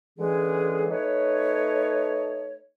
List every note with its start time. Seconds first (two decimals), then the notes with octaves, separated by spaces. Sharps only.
0.19 A2 D3 E3 G#3 C#4 G#4
0.91 A3 D#4 B4 C#5